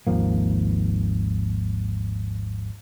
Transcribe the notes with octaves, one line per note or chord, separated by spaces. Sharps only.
G#1 D#2 F3 A#3